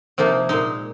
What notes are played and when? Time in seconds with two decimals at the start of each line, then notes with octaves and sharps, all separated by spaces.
0.18 C3 F3 A#3 D#4
0.49 A#2 G#3 D#4